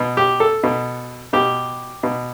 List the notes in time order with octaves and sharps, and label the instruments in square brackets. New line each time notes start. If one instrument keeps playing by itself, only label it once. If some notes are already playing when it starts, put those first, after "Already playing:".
Already playing: [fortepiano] B2
G4
A4
B2
B2 G4
B2